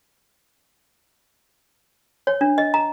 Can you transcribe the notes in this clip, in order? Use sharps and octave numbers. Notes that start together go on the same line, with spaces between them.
C#5
D4
D#5
A#5